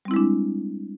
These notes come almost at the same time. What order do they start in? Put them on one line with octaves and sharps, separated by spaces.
G3 C4 E4 G#3 D4